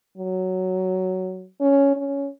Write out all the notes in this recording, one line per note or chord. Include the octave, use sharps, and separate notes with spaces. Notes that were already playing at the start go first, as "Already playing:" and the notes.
F#3
C#4
C#4